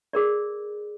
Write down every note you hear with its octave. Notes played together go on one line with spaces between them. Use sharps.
G#4 A#4 D5